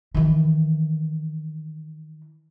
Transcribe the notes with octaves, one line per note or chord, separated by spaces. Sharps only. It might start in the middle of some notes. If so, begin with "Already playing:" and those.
D#3 E3